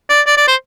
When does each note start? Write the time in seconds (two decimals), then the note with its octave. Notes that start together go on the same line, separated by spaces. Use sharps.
0.10 D5
0.26 D5
0.37 D5
0.47 C5